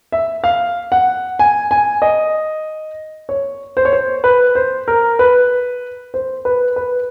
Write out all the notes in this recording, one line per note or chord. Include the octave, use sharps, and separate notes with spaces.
E5
F5
F#5
G#5
G#5
D#5
C#5
C5
C#5
C5
B4
C5
A#4
B4
C5
B4
B4